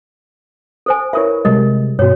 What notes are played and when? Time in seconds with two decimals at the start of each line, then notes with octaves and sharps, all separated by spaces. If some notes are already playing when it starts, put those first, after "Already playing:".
0.86 A4 C5 G#5
1.13 E4 A#4 B4 C#5 E5
1.45 C3 G3 G#3 A#4 D#5
1.99 G2 B2 F#4 C#5